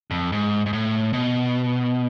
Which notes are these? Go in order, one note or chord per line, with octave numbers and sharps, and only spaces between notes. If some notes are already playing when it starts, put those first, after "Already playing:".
F2
G#2
G#2
A2
B2